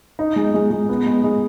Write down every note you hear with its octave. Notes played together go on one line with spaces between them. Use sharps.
D#4
G#3
G#3
G#3
B3
G#3
G#3